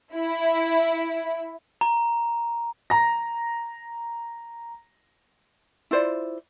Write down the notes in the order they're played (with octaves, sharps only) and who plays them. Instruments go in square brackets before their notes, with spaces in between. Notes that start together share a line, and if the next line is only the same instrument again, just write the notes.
[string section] E4
[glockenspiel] A#5
[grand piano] A#5 A#6
[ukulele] E4 F4 C5 D5